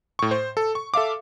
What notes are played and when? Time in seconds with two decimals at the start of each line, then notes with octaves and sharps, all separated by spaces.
0.19 A2 C#6
0.31 C5
0.57 A4
0.75 C#6
0.94 A4 E5 F5 D6